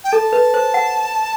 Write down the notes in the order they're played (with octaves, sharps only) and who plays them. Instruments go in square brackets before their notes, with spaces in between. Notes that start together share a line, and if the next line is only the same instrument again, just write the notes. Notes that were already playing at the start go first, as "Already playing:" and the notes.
[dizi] G5
[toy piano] A4 [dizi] A5
[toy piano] B4
C5
F#5